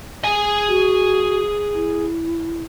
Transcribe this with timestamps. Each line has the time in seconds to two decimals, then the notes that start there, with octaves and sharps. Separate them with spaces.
0.24 G#4 G#5
0.68 F#4
1.74 E4